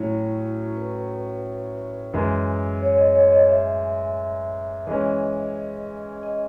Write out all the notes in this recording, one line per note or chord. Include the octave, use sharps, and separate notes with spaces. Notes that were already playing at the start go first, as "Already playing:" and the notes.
Already playing: A2 F#3 C#4 E4
B4
F#2 E3 G#3
C#5
D#5
C#5
D#5
E5
E3 G#3 C#4 D#5
D#5